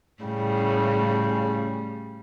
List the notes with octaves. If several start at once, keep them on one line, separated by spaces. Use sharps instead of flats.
A2 C#3 G3